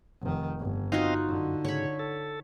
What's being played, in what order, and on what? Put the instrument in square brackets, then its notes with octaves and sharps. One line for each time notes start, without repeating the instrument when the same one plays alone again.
[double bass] F1 D#3
G1
[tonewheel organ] C4 D#5 F5 [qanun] D#4 F4 F#4
[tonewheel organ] F#2 [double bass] D3
[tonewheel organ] G#2 C#3 [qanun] C#5 B5
[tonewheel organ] A4